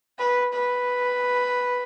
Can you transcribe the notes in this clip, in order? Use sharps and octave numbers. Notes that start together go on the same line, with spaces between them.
B4
B4